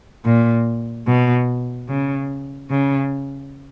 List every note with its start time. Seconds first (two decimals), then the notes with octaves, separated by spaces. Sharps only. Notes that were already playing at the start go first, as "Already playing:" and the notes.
0.25 A#2
1.07 B2
1.89 C#3
2.70 C#3